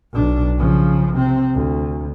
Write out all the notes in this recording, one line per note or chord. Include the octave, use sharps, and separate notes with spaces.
B1 D4
C#3 F3
C3 C4
D2